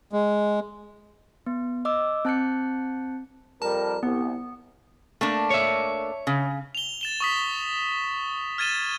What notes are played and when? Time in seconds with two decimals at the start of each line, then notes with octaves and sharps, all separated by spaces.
0.13 G#3
1.46 B3
1.85 D#5 D6 E6
2.25 C4 A5 F#6 G6 C#7
3.62 F2 G3 A#4 A5
4.03 C2 B3
5.21 A3 A#3 D4
5.50 C#5 E5
6.27 C#3
6.75 F7 G7
7.01 A6 E7 G7
7.20 C#6 D#6 B6
8.58 F6 G#6 A6 D#7 E7 G7